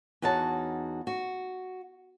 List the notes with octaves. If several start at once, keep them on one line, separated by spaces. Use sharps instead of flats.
E2 D#4 F#4 C#5 A5
F#4